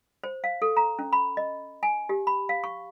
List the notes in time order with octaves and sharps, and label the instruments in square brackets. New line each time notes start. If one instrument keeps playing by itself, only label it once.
[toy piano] C5
F5
A4
A#5
C#4
B5
D#5
G#5
G4
B5
F5
C#6